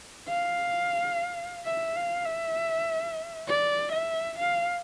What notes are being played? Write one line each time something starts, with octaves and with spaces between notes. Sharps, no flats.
F5
E5
F5
E5
D5
E5
F5